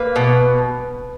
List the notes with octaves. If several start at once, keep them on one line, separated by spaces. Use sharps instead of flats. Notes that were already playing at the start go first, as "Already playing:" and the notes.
Already playing: A#3 B4
B2